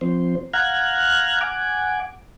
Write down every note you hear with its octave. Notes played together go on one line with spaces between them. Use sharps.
F3 C4 C5
F5 F#5 A#5 F6 F#6 G#6
F#5 G#5 D6